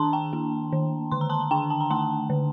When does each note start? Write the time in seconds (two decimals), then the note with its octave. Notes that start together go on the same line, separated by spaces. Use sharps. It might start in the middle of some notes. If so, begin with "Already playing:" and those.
Already playing: D#3 D4 A5 A#5 C6
0.13 G5 A#5
0.33 A#3
0.72 D#3
1.12 D3 C6
1.21 A#5
1.30 A5 C6
1.51 D4 G5 A#5
1.70 A5
1.81 A#5
1.90 A3 A5 C6
2.30 D3